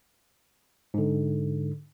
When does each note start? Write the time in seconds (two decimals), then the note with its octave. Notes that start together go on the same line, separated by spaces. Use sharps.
0.94 G#2 D3